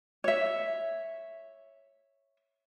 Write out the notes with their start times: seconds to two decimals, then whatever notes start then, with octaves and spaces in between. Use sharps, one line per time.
0.24 C#5 E5